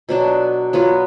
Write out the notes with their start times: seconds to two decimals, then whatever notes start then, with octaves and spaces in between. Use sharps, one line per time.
0.09 B2 F#3 D4
0.73 F#3 B3 F4 B4